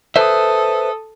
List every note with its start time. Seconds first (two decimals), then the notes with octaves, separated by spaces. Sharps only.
0.16 A4 B4 C5 E5 D#6